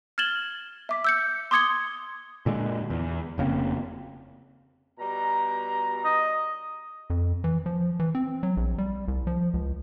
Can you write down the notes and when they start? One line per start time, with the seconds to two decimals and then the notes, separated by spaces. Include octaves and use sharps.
0.18 F6 G#6 A6 E7 F#7 G7
0.89 E5 D6 B6
1.04 E6 G6 C#7
1.51 C6 D6 D#6 G#6 C#7 G7
2.46 A#2 D3 G#3
2.90 E2
3.38 F1 C#3 A#3 C4
4.99 B2 G3 A#5
6.05 D#5
7.10 F2
7.44 E3
7.66 F3
8.00 E3
8.15 C4
8.43 F#3
8.57 A#1
8.78 G3
9.08 C2
9.27 F3
9.54 C#2